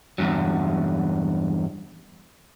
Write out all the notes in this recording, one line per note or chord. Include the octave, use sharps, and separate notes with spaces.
E2 G2 F#3